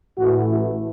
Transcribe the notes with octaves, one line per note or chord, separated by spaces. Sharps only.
A1 A2 E3 A3 F#4
E4